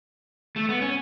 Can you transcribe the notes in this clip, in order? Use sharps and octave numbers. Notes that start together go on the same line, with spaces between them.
A3
B3
C#4